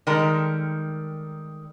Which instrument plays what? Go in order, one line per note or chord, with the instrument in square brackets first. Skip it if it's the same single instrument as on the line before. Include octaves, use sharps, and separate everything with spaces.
[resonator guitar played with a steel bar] D#3 G3 G#3 A4 A#4